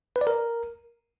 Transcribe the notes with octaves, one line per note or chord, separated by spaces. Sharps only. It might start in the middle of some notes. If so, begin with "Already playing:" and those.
B4
D5
A#4